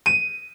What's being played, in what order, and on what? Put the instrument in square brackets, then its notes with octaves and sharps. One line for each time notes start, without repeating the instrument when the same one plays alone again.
[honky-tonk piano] D#7